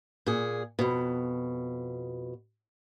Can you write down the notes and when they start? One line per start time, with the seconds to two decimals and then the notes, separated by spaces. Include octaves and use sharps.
0.26 A#2 G#4
0.79 F2 B2